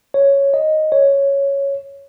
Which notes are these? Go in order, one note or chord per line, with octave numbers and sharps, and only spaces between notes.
C#5
D#5
C#5